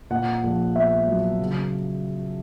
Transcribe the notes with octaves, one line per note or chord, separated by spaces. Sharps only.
A#2 F#5
A#1
B3 E5
F#3
C#3